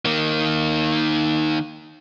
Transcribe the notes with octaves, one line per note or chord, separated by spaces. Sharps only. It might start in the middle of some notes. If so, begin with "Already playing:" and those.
D#3 A#3